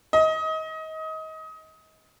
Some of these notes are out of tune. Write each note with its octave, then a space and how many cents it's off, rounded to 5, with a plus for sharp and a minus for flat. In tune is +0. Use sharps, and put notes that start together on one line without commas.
D#5 +25